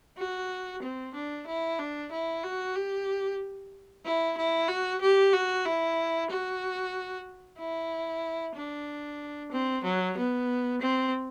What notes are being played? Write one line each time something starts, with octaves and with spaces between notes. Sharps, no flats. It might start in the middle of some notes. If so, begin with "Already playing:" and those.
F#4
C4
D4
E4
D4
E4
F#4
G4
E4
E4
F#4
G4
F#4
E4
F#4
E4
D4
C4
F#3
B3
C4